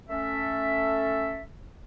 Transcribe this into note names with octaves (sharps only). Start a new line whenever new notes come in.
A3 C#4 A4 E5